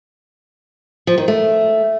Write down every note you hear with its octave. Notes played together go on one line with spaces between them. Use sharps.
F3
D#3
A3